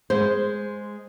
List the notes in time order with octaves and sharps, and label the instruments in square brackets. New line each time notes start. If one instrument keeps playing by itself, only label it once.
[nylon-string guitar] G#3 C5